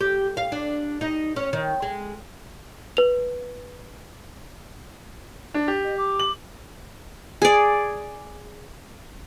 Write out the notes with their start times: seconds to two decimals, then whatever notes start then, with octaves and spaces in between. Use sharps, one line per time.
0.01 G4
0.37 F5
0.52 D4
1.01 D#4
1.36 C#4
1.53 D#3
1.82 G#3
2.97 B4 F7
5.54 D4
5.68 G4
5.84 D#5
5.97 D6
6.19 F#7
7.42 G#4 D5